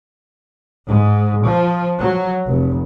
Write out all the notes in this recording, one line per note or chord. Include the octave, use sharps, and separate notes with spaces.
G#2
F3
F#3
F1